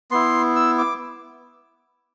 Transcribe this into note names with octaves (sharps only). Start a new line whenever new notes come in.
B3 E4 C6
E6
D6